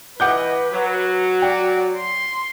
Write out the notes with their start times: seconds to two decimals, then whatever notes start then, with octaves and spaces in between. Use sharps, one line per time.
0.20 E3 B4 D#5 F#5 D6 G6
0.73 F#3
1.42 F#4 D5 G5
1.97 C6